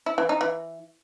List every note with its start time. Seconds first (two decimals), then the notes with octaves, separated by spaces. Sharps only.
0.06 E4
0.18 E3
0.29 D#4
0.41 E3